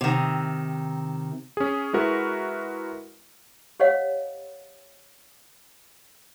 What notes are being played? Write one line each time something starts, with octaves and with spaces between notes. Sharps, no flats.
C3 D#3
C#4 G#4
G#3 E4 F#4 A#4 B4
G4 C5 C#5 D#5 F5 F#5